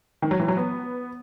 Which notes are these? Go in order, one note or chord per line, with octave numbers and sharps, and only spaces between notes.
D#3
F#3
E3
F#3
B3